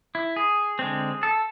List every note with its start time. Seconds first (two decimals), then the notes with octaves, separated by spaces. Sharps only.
0.15 E4
0.36 G#4
0.79 D3 G#3 C4
1.23 A4